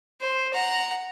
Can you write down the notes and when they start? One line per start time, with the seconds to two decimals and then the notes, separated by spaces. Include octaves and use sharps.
0.21 C5
0.53 F#5 A#5